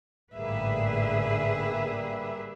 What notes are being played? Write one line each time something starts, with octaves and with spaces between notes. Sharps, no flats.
A1 G#2 D3 G3 A#3 G#4 B4 E5